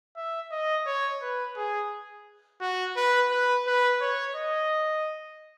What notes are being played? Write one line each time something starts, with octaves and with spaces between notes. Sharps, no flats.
E5
D#5
C#5
B4
G#4
F#4
B4
B4
B4
C#5
D#5